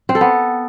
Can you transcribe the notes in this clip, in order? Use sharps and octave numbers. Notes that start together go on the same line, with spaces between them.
C4
A4
B3